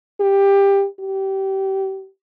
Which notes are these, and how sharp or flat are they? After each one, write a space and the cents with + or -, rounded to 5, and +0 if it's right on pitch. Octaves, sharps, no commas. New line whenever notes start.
G4 +15
G4 -25